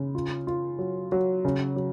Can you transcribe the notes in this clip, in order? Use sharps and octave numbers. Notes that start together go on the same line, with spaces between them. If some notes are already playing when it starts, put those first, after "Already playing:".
Already playing: C#3
F4
F4
F#3
F#3
C#3
F#3